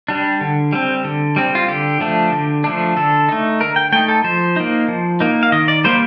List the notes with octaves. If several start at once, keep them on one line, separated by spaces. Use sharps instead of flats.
G3 D4
D3
G3 C4
D3
G3 C4
F4
D3 G4
F3 A3 D4
D3
F3 A3 D4
D3 A4
A3 D#4
D3 A#4
G5
A3 D#4 G5
A4
F3 C5
A#3 D#4
F3
A#3 D#4
F5
D#3 D#5
D5
G3 A#3 C5